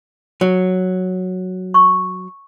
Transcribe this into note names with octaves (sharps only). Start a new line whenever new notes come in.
F#3
C#6